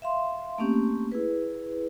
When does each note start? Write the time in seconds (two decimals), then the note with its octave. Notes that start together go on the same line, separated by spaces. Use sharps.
0.02 E5 F5 C6
0.58 A3 A#3 C4 C#4 G4
1.12 E4 G#4 B4